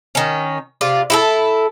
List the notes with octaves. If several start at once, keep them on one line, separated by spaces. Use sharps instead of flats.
D#3 C#4
C3 F4 D5
E4 G4 A4